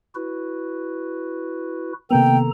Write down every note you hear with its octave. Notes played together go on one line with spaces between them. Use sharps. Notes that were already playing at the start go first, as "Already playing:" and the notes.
E4 F#4 B4
C3 D#3 A#3 B3 A4 G5 A#5